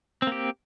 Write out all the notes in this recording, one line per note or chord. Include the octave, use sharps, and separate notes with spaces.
A#3 C4 G4